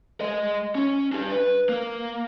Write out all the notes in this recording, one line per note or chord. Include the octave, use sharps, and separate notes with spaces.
G#3 D#5
C#4
D4 G4
B4
A#3